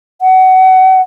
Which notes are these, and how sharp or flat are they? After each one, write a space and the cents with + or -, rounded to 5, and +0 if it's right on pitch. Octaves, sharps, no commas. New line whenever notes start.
F#5 +25